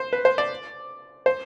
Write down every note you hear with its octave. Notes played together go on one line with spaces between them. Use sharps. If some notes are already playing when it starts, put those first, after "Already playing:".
Already playing: C5
B4
C5
D5
C5